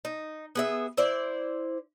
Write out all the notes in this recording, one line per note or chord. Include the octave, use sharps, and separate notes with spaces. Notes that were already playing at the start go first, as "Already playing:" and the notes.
D#4
B3 G#4 E5
E4 C5 D5